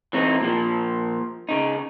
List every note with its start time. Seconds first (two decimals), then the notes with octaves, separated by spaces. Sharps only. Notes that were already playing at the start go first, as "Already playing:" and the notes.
0.13 E3 C4 D#4
0.41 A#2 F3
1.49 C#3 D#4